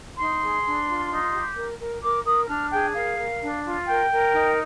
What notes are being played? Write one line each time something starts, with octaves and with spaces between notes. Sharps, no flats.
D#4 C6
G#4
D4
F4
D#4
G4
A#4
A#4
A#4 D6
A#4 D#6
D4 F6
G#4 G5
A#4 F5
A#4
D4
F4
A#4 G5
A#4
D#4